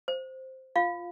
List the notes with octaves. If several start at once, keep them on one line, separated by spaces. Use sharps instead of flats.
C5
F4 F5